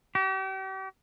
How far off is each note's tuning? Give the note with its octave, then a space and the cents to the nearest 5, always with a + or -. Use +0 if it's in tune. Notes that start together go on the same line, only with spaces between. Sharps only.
G4 -40